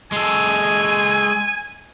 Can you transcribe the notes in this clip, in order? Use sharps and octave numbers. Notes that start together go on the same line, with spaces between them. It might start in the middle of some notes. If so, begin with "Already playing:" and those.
G#3 A4 G#5